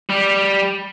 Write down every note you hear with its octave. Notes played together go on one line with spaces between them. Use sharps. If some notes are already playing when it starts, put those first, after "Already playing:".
G3